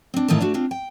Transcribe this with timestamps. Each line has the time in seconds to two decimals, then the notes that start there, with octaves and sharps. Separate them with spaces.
0.14 C4 D4
0.28 A2 D#3 E3 F4 A4 A5
0.41 A3 D4 F#4
0.54 C4 D4 F4
0.71 G5